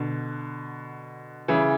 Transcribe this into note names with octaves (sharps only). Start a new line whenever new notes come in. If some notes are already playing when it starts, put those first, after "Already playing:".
Already playing: B2 D3
C#3 E3